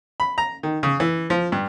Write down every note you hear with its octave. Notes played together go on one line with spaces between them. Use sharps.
B5
A#5
D#3
C#3
E3
F3
G2